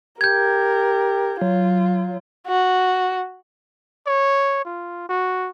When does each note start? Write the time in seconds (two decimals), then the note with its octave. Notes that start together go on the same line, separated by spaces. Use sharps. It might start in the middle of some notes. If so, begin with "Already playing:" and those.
0.21 G4 A#4 G6 G#6
1.41 F#3 F4
2.47 F#4
4.07 C#5
4.65 F4
5.09 F#4